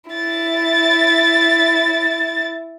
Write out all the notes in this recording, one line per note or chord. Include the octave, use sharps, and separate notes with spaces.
E4 A6